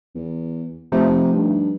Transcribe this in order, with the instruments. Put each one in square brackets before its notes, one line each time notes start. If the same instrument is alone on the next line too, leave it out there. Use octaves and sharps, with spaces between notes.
[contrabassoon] E2
[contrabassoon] C3 [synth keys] F3 A3 D#4
[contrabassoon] G2